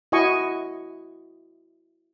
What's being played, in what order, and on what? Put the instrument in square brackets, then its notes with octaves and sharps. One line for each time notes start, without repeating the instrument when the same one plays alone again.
[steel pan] E4 F#4 D#5 G#5 C#6